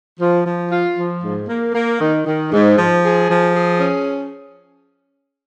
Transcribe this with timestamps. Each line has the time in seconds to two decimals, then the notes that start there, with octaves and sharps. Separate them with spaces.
0.20 F3
0.45 F3
0.71 F4
0.97 F3
1.23 G#2
1.48 A#3
1.74 A#3
2.01 D#3
2.25 D#3
2.52 G#2
2.78 F3
3.04 G#4
3.29 F3
3.56 G#4
3.81 C#4